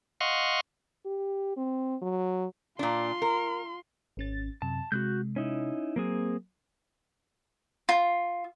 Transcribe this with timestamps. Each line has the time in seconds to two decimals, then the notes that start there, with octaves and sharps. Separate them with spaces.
0.21 D#5 F5 F#5 C6 C#6
1.06 G4
1.57 C4
2.02 F#3
2.79 A#2 D4 F4 C6
3.22 A#4
4.17 G#1 C#4 A6
4.62 F#2 C3 A5
4.92 C3 G#3 F#4 F#6 G6
5.36 C#4 D#4 E4
5.96 F#3 A#3 C4 G#4
7.89 F4